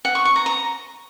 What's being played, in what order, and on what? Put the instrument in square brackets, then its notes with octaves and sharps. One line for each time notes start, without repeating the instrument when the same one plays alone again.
[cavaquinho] F#5
C#6
C#6
A#5
A#5